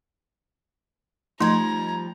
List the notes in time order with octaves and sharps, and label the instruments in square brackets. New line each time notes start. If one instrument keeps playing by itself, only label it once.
[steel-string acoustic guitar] F3 G3 [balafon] A3 C6 [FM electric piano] D#4 G#6 [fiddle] A#5